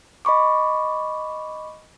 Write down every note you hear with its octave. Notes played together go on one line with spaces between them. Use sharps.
D#5 B5 C#6 D6